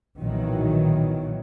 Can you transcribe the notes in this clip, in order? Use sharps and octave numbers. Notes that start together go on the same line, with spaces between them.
B1 A#2 D#3 E3 F#3